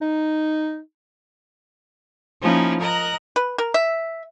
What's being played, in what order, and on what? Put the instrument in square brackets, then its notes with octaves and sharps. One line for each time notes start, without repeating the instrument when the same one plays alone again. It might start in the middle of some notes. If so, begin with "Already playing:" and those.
[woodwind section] D#4
[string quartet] F3 A#3 C#4 D#4 E4
A#4 D#5 A#5 F#6
[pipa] B4
A#4
E5